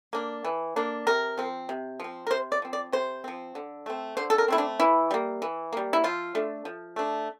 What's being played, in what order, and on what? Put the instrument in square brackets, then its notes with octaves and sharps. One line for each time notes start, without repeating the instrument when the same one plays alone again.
[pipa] A#3 D4
E3
A#3 D4
C3 A#4
F3 C4
C3
F3 C4
A#4
C3 C5
D5
F3 C4
D5
C3 C5
F3 C4
D3
A3 C4
D3 C5
A4
A#4
A3 C4 E4
D4
E3 E4
G3 A#3
E3
G3 A#3
E4
F3 F4
A3 D4
F3
A3 D4